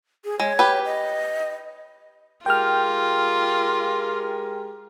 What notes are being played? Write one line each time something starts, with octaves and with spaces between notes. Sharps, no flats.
G#4
G#3 C#5
G4 B4
D#5
G#3 F4 G4 A#4 G5 F6